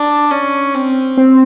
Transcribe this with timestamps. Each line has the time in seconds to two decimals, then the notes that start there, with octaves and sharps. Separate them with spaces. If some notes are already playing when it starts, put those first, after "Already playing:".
Already playing: D4
0.31 C#4
0.74 C4
1.17 C4